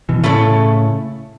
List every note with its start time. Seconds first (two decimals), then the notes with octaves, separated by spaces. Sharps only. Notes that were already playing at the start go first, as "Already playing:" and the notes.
0.09 B2 E3
0.24 A2 C#3 A3 E4 A4 C#5